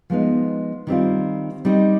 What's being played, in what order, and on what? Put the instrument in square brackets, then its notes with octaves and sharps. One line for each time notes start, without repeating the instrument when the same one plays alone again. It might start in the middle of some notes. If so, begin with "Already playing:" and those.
[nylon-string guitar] F3 G#3 B3 D#4
D#3 G3 C4 F4
G3 C4 D#4